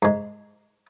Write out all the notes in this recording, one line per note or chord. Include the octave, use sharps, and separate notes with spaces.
G#2 G#3